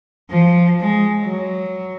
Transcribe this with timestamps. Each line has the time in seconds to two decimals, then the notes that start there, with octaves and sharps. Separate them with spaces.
0.30 F3
0.81 G#3
1.23 F#3